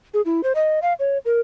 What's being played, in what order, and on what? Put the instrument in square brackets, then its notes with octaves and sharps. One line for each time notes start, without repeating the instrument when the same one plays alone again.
[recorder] G#4
E4
C5
D#5
F5
C#5
A#4